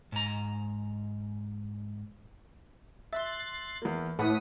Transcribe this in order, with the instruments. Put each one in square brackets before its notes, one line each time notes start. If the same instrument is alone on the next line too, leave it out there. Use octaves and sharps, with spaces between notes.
[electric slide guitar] G#2 A#5
[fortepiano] E5 [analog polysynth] C6 F#6 A6
[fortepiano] E2 A#3
[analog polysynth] A2 D#6 B6 [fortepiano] B4 F#5